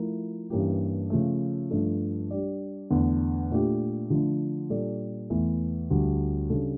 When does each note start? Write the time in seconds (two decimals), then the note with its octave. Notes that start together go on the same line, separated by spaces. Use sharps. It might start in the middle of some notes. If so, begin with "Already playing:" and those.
Already playing: F3 A3 E4 A#4
0.50 G2 E3 A#3 C#4 G4
1.10 C#3 F3 A3
1.71 G2 F3 A3 D4 A4
2.31 G3 D4 G4 D5
2.90 E2 D3 A3
3.50 A#2 A3 D4 G4
4.10 D3 F3 A3 D4
4.70 A#2 G3 D4 A4 D5
5.30 E2 E3 A3
5.90 D2 D3 G3
6.50 C#3 G3 D4 A4